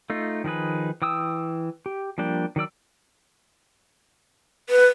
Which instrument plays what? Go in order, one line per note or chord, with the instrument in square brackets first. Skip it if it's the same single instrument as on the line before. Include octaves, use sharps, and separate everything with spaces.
[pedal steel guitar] A3 D#4 F4
D#3 F3 D#4 G#4 B4
E3 G5 D#6 E6
G4
F3 G3 A#3 D4 G5
D#3 F#3 D5 E6
[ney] B4